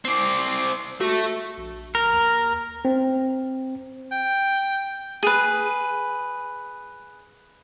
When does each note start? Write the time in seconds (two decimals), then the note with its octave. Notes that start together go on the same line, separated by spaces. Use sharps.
0.05 C4 D5 C7
1.01 A3 F#4
1.58 A#1
1.95 A#4
2.13 D#2
2.85 C4
4.12 G5
5.23 G#4 B4